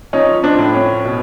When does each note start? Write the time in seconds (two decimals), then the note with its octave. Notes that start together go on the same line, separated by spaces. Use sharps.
0.13 F3 C#4 D#4
0.43 C4 D4
0.58 A2
0.74 C#4
1.04 B2